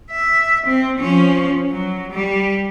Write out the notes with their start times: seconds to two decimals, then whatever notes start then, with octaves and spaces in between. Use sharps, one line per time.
0.11 E5
0.67 C4
0.99 F3 C#4
1.70 F#3
2.12 G3